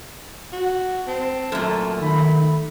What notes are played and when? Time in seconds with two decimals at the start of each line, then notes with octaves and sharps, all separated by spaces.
0.53 F#4
1.07 C4 A5
1.52 F#2 A#2 A3
2.01 D#3 B5